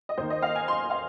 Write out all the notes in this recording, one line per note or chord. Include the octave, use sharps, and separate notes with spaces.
D#5
D#2 D#3 C5
D#5
F5
G#5
C6
F5